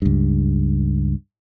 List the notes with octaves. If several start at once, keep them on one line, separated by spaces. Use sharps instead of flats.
C#2 G2